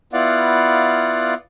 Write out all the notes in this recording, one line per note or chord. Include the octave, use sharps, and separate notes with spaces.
B3 E4 F4 D5 F5 F#5